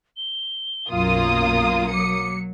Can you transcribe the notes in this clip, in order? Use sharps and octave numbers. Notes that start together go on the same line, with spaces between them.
G7
B1 F#2 A#3 F4 F5 D#6
F#3 D6 C#7